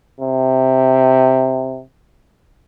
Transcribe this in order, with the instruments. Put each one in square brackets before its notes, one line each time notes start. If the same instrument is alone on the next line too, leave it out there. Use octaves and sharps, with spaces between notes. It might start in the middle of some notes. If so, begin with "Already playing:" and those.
[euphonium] C3